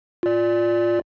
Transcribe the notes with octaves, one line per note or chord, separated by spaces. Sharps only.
F4 D5